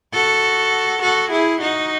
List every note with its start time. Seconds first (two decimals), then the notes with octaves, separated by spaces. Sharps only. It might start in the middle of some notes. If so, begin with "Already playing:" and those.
0.13 F#4 A4
1.02 F#4 A4
1.31 E4 G#4
1.62 D#4 F#4